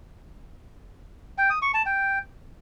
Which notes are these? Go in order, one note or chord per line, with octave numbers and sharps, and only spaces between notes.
G5
D#6
C#6
A5
G5